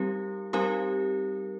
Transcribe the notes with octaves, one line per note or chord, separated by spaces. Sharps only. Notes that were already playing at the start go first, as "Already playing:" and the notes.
Already playing: G3 C4 D#4 G4 A#4
G3 C4 D#4 G4 A#4